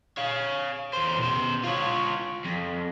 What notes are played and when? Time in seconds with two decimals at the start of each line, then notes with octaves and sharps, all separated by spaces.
0.17 C#5 F5
0.93 E2 C5
1.19 B2 C5
1.64 F4 C#5
2.45 F2